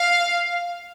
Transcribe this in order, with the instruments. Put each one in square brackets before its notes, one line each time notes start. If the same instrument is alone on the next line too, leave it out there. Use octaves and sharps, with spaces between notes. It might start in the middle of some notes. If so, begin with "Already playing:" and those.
Already playing: [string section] F5